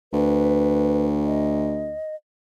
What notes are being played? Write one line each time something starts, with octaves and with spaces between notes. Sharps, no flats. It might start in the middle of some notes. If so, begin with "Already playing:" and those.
D2 B4
D#5